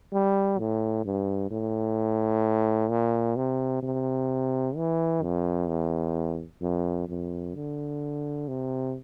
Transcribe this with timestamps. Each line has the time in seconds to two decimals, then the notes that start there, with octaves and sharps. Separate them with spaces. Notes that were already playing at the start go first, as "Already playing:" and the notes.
0.12 G3
0.59 A2
1.05 G2
1.51 A2
2.90 A#2
3.36 C3
3.83 C3
4.76 E3
5.23 F2
5.68 E2
6.61 F2
7.09 F2
7.55 D3
8.48 C3